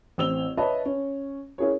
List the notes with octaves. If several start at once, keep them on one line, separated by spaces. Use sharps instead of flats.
A1 C4 E6 F7 G7
B4 C#5 D#5 E5 A5 B5
C#4
C#4 E4 G#4 A#4 C#5